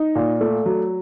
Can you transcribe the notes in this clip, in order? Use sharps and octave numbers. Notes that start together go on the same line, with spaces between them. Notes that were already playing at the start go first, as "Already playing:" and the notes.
Already playing: D#4
A#2
A3
F#3